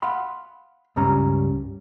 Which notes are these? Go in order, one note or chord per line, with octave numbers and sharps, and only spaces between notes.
F5 F#5 B5 C6
C#2 G2 G3 C#4 A#5